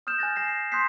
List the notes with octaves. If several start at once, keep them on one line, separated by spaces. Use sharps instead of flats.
D#6 F6 G6 E7
G#5 F#6 A6 A#6
G#5 A#6 C7 E7
C7
C6 D#6 F#6 G6 B6 C7